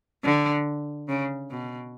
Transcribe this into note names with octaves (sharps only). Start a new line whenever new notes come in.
D3
C#3
B2